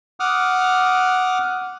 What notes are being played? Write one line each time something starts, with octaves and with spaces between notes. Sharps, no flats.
F#5 D6 D#6 F6